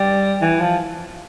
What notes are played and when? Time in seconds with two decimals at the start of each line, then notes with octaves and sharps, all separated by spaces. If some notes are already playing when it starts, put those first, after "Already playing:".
Already playing: G3
0.41 E3
0.60 F3